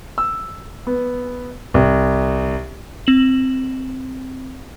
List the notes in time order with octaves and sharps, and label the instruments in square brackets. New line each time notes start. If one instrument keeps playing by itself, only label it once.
[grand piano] E6
B3
C2
[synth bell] C4 E7 F#7